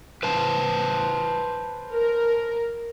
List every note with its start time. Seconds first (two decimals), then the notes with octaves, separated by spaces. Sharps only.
0.23 B4 C5 A5
1.93 A#4